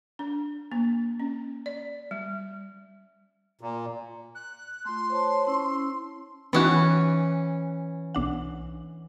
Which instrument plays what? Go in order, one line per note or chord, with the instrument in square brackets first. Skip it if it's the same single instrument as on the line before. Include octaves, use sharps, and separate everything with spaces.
[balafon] D4
A#3
C#4
D5
G3
[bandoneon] A#2
[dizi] F#6
[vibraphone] A3 F4 [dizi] C6
[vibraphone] C5 C#5 A5
C#4 E4 E6
[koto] E3 C#4 [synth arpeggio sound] B3 D#4 F#4
[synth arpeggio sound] B1 D4 F#5